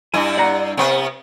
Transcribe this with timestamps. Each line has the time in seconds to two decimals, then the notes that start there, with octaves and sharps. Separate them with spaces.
0.14 G2 E4 G#5
0.38 D5 F#5 A#5
0.77 C3 B3